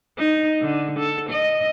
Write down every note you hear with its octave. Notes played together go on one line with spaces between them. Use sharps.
D#4
D3
A4
D#5